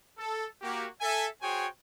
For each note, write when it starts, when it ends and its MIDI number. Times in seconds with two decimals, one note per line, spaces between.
0.17 0.46 69
0.62 0.86 58
0.62 0.86 66
0.62 0.86 67
1.00 1.27 69
1.00 1.27 76
1.00 1.27 80
1.42 1.66 66
1.42 1.66 68
1.42 1.66 72
1.42 1.66 73
1.42 1.66 79
1.42 1.66 80